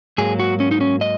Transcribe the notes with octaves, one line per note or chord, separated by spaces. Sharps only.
G#2 F#3 A#3 G#4
F#4
C#4
D#4
C#4
D#5